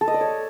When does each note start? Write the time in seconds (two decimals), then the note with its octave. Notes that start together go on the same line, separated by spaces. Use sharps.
0.01 A4
0.08 D#5
0.14 D5
0.21 C#5